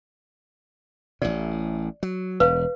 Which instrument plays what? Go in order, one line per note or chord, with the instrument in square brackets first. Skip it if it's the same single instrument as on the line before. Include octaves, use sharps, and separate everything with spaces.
[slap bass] A1 A2 [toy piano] D5
[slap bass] F#3
[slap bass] E1 [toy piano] B4 F5